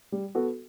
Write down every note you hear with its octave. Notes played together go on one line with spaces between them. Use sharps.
G3
B3 F#4 A4